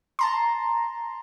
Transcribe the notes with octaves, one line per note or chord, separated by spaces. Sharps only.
A5 A#5 C6